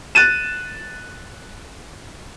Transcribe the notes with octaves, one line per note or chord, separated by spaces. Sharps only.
F#6 A6 D#7 E7